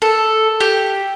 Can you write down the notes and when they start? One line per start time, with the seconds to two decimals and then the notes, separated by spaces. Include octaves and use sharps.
0.02 A4
0.60 G4